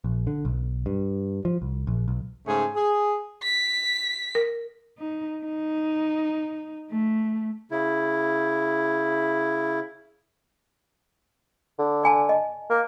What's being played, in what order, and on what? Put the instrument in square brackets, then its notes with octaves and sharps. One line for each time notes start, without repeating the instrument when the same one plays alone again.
[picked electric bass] A#1
D3
B1
G2
F3
C2
A#1
B1
[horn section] G#2 C#3 A3 G#4
G#4
[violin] B6
[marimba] A#4
[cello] D#4
D#4
A3
[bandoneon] C#3 E4
[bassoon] D3
[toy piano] D5 G#5 A5
D#5
[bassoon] A#3